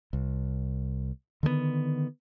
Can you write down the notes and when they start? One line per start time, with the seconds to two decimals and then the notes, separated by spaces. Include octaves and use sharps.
0.13 C2
1.43 D3 D#3 A3 B3